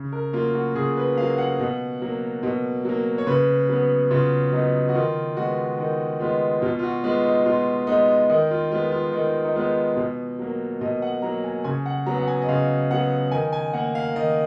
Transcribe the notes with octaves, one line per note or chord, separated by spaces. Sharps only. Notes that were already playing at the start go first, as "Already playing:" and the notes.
Already playing: C#3
A#4
F#3 A#3 F4
F#4
C#3 G#4
B4
F#3 A#3 F5
F#5
B2
F#3 A#3
B2
F#3 A#3
C#5
C#3 B4
F#3 B3 B4
C#3 F4
F#3 B3 D#4
F#4
D#3 F4
G#3 B3 F#4
D#3 D#4
G#3 B3 F4
B2 F4
F4
F#4
G#3 B3 F4
D#4
B2 F4
G#3 B3 D#4
D#3 D#4
F4
G#3 B3 F4
F4
D#3 D#4
D#4
G#3 B3 F4
B2
F#3 A#3
B2 D#5
F#5
F#3 A#3 A#5
G#5
C#3 G#5
F#5
F#3 B3 A#5
F#5
G#5
D#5
C#3 F5
F#3 B3 F#5
D#3 G#5
G#5
A#3 F#5
F5
D#3 D#5